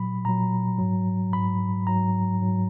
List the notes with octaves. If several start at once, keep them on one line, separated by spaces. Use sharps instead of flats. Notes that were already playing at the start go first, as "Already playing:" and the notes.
Already playing: A#2 F#3 B5
A#2 F#3 A#5
G#2 F#3
G#2 F#3 B5
G#2 F#3 A#5
G#2 F#3